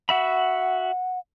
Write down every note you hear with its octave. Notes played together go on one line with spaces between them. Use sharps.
F#4 E5 F#5 B5